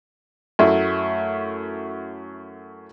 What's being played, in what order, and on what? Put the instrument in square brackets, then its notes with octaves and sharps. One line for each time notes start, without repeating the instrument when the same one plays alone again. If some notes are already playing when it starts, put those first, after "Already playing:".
[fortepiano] F#2 A3 E4